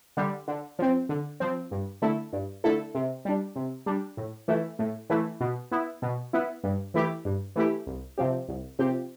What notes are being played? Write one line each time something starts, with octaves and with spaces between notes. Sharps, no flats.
D3 G3
D3
F3 C4
D3
F3 C4
G2
D3 A3 E4 A4
G2
D3 A3 E4 A4
C3
G3 D4
C3
G3 D4
A2
E3 A3 E4
A2
E3 A3 E4
B2
B3 E4
B2
B3 E4
G2
E3 A3 E4 G4
G2
E3 A3 E4 G4
C2
C3 F3 C4 G4
C2
C3 F3 C4 G4